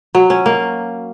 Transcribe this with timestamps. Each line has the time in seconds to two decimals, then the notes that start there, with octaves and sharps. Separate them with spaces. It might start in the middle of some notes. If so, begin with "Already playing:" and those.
0.15 F#3
0.30 C#4
0.46 A#3